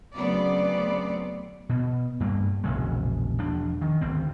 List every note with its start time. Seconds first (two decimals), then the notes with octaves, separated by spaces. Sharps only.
0.15 D2 C#3 F#3 B3 C4 D5
1.69 B2
2.20 G2 G3 A3 A#3
2.64 E1 A#1 C#3 G#3
3.38 E1 F3 D4
3.82 D#3
4.01 G#1 D2 C4